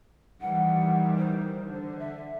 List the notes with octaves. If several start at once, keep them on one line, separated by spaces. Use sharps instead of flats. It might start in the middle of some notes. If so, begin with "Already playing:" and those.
D#3 E3 G3 F#5
C5
D3
E5